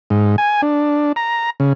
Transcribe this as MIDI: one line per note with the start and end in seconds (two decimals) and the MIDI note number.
0.10 0.36 44
0.38 0.61 80
0.62 1.12 62
1.16 1.50 82
1.60 1.73 49